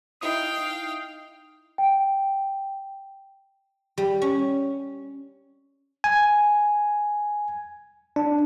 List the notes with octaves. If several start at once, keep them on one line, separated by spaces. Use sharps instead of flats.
D#4 E4 F5 G5 D#6
G5
G3
C#4
G#5
D4